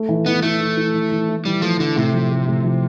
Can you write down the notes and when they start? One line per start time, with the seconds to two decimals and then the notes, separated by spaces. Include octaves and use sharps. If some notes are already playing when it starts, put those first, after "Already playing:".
Already playing: A3
0.09 E3
0.26 E3 B3
0.42 A3 E4
0.60 E4
0.77 E4
0.93 E3
1.11 E3
1.29 E4
1.45 E3 G3
1.62 F3 A3
1.79 D3 E4
1.96 A2 C3
2.14 F3
2.31 A3
2.48 A2
2.65 F3